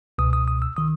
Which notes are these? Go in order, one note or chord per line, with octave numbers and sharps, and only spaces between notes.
C#2 B2 D#6
D#6
D#6
E6
D#3 D#6